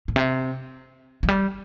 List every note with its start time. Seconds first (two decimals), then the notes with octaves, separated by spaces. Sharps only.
0.08 A2
0.16 C3
1.23 F3
1.28 G3